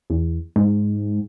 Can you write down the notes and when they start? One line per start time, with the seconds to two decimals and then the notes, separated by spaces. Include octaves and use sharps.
0.10 E2
0.56 G#2